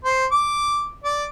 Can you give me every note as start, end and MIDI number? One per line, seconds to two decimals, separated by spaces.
0.04 0.25 72
0.32 0.89 86
1.04 1.25 74